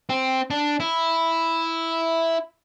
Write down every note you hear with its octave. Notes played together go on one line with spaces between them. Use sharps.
C4
D4
E4